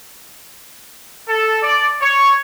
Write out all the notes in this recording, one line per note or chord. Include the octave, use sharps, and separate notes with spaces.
A4
D5
C#5